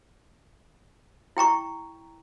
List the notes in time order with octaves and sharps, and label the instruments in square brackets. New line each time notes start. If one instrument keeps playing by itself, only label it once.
[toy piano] E4 G5 A#5 C#6